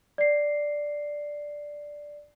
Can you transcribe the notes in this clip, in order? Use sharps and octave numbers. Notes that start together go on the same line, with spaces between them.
D5 C7